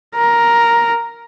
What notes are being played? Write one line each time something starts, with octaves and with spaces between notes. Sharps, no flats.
A#4